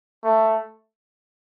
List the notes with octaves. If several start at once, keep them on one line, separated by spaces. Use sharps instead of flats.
A3